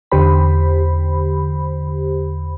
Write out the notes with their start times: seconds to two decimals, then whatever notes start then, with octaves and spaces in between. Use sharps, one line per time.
0.12 E2 D3 G4 C5 B5